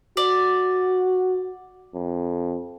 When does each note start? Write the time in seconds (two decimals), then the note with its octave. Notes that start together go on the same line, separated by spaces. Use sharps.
0.17 F#4 D5
1.94 F2